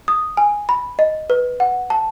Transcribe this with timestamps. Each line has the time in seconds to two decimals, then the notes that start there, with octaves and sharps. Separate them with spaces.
0.08 D#6
0.37 G#5
0.69 B5
0.99 D#5
1.30 B4
1.60 F#5
1.90 A5